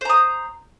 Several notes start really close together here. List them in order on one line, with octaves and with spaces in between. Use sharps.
C5 A#5 D#6